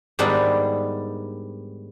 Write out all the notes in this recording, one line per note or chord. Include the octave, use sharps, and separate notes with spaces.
G#2 D#3 G3 B3 D4 D#4